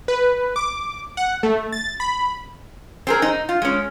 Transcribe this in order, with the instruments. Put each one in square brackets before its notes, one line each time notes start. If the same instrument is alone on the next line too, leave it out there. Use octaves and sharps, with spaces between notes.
[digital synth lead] B4
D6
F#5
A3
A6
B5
[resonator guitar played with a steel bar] C4 G#4 A#4
D#4
F4
G#3 C#4